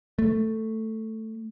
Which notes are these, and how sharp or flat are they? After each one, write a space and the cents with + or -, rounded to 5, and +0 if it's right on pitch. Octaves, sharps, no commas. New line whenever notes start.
A3 +5